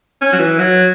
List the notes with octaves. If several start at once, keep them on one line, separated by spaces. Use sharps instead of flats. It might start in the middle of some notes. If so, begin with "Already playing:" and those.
C#4
F#3
E3
F#3